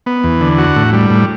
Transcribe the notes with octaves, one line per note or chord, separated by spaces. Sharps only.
B3
E2
D3
F#4
A2
G3
A2